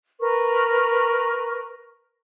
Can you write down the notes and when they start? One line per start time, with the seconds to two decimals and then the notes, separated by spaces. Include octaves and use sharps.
0.20 A#4 B4 C#6